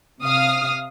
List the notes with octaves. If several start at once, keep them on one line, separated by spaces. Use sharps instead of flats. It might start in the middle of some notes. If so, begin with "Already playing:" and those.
C3 F5 D#6 F6